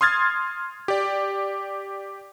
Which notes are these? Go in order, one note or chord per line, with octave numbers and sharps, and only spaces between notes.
C6 D#6 F6 G#6 A6
G4 D5